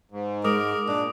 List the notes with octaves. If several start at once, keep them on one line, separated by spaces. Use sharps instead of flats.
G#2
G#3 A#4 D6 D#6 D7
A#2 D4